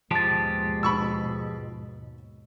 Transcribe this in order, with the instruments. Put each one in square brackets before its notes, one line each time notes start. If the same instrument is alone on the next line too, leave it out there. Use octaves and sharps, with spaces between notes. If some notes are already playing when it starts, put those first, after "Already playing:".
[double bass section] D#2 G#2 B2 [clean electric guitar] F3 G#3 G4 [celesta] A5 A6
[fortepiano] B5 C#6 E6